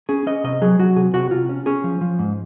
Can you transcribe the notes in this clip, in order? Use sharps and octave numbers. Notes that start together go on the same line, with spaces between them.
C#4 G#4
C#4 D#5
C3 D#5
F#3 G#4
F#3 F#4
C3 G#4
C3 F#4
C3 F4
C#4
C#4 G#4
F3
F3
G#2